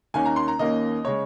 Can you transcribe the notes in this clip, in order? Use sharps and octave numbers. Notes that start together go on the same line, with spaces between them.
D#2 D#3 A#3 C#4 G#5
A#5
C6
A#5
D#2 D#3 A#3 C#4 D#5
C#3 G#3 C#5